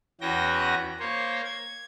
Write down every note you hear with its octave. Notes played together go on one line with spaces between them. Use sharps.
E2 E3 C#4 F#4 G5 A#6
A#3 C5 C#5
G#6